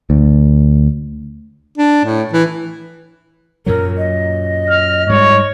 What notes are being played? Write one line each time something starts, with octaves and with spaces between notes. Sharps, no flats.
D2
D4
A2
E3
F#2 A#2 F#3 A#4
D#5
F6
G#2 G3 C#5